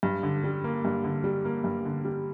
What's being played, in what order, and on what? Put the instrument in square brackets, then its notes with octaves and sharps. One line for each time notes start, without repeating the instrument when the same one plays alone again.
[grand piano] G2
D3
G3
A#3
G2
D3
G3
A#3
G2
D3
G3